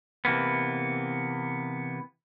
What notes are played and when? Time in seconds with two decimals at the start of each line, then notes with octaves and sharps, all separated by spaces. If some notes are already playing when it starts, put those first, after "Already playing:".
0.25 C3 E3 A#3 B3